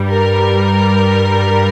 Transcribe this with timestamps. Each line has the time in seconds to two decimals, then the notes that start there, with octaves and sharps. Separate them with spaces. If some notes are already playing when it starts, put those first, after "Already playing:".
Already playing: G2 G3
0.10 A#4